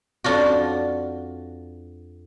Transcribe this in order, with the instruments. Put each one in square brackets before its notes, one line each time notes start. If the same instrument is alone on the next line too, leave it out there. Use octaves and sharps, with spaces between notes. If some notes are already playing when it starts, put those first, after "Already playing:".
[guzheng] F2 D4 F4 F#4